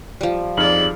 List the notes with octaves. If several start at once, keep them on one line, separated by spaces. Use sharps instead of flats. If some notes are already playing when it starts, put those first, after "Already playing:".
F3 G3
F2 D#4 G#4 D5 F6 F#7